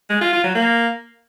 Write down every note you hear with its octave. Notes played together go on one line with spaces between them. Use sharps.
G#3
F4
F4
F#3
A#3